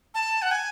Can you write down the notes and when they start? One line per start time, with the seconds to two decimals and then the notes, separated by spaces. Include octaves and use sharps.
0.14 A5
0.42 F#5
0.51 G#5